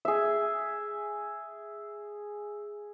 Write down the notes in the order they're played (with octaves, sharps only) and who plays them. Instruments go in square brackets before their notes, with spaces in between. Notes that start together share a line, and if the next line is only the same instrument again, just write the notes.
[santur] G#4 E5